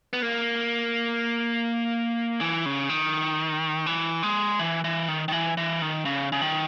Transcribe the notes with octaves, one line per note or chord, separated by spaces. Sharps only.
B3
A#3
E3
C#3
D#3
E3
G#3
E3
E3
D#3
D#3
E3
E3
D#3
C#3
C#3
D#3